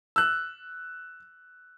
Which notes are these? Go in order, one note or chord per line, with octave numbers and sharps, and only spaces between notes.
E6 F#6